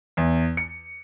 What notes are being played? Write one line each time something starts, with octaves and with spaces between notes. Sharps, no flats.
E2
C#7